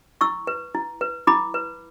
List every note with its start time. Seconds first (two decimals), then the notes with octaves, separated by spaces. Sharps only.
0.21 E4 C#6 E6
0.47 B4
0.74 E4
1.01 B4
1.27 E4 B5 D6
1.54 B4